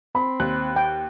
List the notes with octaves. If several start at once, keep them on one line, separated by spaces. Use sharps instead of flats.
C4 B5
D#2 F#6
G5